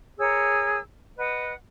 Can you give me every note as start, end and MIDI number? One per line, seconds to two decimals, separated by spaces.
0.19 0.79 68
0.19 0.79 70
0.19 0.79 73
0.19 0.79 88
1.18 1.53 71
1.18 1.53 75
1.18 1.53 78